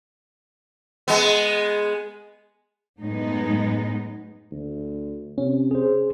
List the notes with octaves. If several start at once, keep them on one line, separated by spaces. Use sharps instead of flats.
G#3 B3
F#2 A2 G#3 B3 D#4
D2
C3 C#4
G#4 C5